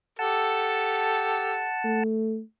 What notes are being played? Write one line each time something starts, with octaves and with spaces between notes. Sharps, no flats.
G4 A4 F#5 A5
A3